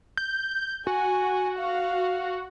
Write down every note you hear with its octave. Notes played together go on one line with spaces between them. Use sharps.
G6
F#4 G#5
F5